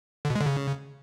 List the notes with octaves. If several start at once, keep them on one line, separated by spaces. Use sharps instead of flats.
D3
B2
G#3
D3
C#3